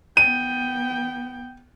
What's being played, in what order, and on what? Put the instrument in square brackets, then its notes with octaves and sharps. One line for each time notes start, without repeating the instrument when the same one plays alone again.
[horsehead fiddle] B3 G5 [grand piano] D#7